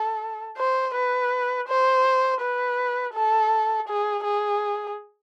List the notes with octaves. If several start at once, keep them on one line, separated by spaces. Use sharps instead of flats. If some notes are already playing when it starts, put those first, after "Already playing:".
Already playing: A4
C5
B4
C5
B4
A4
G#4
G#4